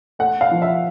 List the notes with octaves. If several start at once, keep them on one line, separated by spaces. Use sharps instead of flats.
A3 F#5
F5
F3
E5